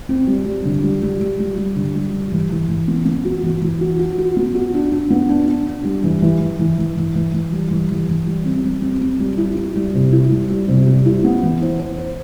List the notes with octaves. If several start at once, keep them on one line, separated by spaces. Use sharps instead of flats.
C4
G3
G3
D3
G3
G3
G3
G3
G3
D3
G3
G3
E3
E3
E3
B3
B3
F#4
E3
E3
F#4
F#4
F#4
B3
F#4
D4
D4
B3
D4
D4
D4
G3
E3
E3
E3
E3
E3
E3
E3
E3
G3
E3
E3
E3
G3
C4
G3
C4
C4
G3
E4
E4
G3
C3
E4
G3
G3
C3
G3
E4
B3
E3
C5
C5
C5